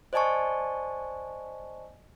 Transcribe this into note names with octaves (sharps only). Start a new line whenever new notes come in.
C5 D5 D#5 G#5 A5 C#6